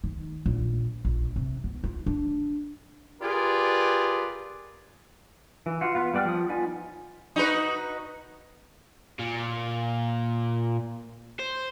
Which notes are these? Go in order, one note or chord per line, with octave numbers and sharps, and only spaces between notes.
D#3
A#1
A#1
C3
B3
F4
D4
F4 G4 G#4 A#4 B4 D5
E3
F4 F#4
B3 F4
G3 B3 D5 G5 F6
F3 D#6
B3 D#4 F4 D5 G#5
D#4 F#4 B4
A#2
C5